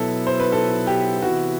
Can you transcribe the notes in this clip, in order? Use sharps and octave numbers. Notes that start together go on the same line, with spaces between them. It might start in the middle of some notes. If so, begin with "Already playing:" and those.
Already playing: B2 F#3 B3 E4 A4
C5
B4
A4
G4
C3 E3 B3 E4 F#4